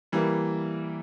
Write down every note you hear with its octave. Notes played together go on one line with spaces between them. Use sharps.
E3 G3 A#3